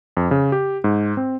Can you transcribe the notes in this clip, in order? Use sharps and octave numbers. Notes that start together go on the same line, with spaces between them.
F2
C#3
G4
G#2
C4